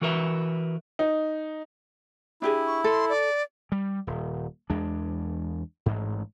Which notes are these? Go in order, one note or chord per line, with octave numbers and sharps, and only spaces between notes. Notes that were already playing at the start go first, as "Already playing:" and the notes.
E3 F#4 A#4 B4 E5
D#4
D4 E4 G4 G#4
C#6
A4 C6
D5
G3
D#1
E2 G#3 D4
A1 G#2